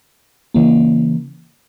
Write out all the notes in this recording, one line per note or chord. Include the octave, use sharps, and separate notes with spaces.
C#3 E3 A#3